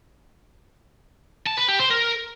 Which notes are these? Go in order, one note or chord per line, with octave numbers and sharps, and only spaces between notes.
A5
B4
G4
C5
A#4